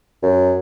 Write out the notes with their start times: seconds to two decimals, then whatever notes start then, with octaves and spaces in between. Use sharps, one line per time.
0.23 F#2